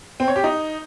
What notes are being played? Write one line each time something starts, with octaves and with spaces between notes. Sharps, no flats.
C4
C#5
G4
D#4